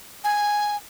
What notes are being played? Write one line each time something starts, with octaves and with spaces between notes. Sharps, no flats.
G#5